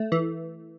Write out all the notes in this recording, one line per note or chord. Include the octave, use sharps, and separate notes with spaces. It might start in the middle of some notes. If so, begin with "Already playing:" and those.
Already playing: A3
E3